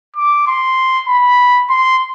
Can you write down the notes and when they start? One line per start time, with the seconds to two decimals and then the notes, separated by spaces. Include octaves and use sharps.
0.16 D6
0.47 C6
1.08 B5
1.69 C6